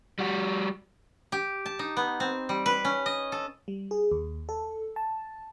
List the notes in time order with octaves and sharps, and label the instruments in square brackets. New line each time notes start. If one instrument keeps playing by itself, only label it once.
[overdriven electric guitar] G3 F#4
[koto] G4
A5
D#4
B3
C4
G3
B4
C#4
D#5
A4
[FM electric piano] G3
G#4
D#2
A4
A5